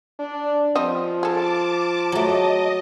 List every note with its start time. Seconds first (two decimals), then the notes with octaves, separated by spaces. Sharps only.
0.19 D4
0.75 F3 G3 C4 D#5
1.23 G#4 A4 A5 D6
2.12 F#3 A3 D#5